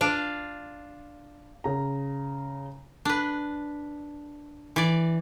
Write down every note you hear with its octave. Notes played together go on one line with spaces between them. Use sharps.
D4 F4
C#3 A#5
D4 B4
E3 D5